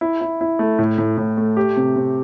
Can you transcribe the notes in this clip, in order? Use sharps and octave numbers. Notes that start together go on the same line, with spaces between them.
E4
E4
E4
A3
A2
A2
A2
A3
G4
C3
C3